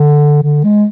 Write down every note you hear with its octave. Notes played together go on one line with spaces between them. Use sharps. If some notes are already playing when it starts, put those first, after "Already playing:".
Already playing: D3
D3
G#3